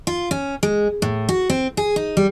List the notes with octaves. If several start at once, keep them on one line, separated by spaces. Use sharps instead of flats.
F4
C#4
G#3
A2
F#4
C4
G#4
D#4
G3